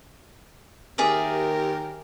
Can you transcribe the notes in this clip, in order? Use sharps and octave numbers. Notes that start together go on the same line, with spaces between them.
D#2 G4 G#4 A#4 D5 E5